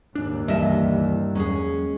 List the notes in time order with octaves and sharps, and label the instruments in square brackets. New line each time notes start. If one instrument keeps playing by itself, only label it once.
[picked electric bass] F#1 G#2 D4 [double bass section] D#2
[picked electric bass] C#2 E3 [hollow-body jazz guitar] G2 [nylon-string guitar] D#5 E5
[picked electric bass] E2 F#3 G#3 [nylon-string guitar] C#4 G#4